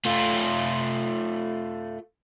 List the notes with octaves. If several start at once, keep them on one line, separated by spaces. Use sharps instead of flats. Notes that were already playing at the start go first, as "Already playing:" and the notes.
A3 F4